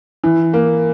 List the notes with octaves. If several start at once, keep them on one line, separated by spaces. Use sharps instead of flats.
E3
A#3